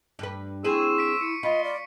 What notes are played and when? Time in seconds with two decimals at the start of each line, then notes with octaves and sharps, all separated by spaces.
0.19 G2 B4
0.64 C4 E4 G#4 C6 C#6 E6 D#7
0.98 B6 D7
1.21 E4 C#7
1.43 F4 D#5 B5 C6
1.64 D5